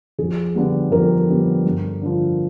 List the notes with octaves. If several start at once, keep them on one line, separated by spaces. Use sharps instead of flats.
F2 G#4
D3 G3 B3
F2 A#4
D3 G3 B3
G2
D3 F3